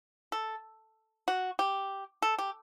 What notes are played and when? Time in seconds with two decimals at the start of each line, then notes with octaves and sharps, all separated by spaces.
0.32 A4
1.28 F#4
1.59 G4
2.22 A4
2.38 G4